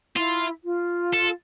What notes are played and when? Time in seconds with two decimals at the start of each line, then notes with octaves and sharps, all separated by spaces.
0.16 E4 F4
0.64 F4
1.13 A4